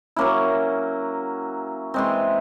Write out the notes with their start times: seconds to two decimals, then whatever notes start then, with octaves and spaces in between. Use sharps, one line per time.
0.16 F#3 A#3 C#4 E4
1.94 E3 G#3 C4